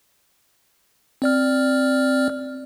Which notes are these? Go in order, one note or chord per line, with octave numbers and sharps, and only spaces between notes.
C4 D5 F6